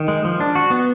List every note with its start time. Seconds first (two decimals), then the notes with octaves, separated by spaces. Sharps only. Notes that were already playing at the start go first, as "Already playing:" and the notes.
Already playing: D#3
0.08 G#3
0.25 F3
0.40 D4
0.55 F#4
0.70 B3